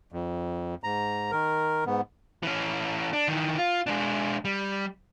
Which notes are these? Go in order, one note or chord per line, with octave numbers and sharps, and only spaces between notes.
F2
G#2 A#5
D#3 A#4
G#2 B3
E3 C#4
D4
D#3 E3
F4
G#3 D4
G3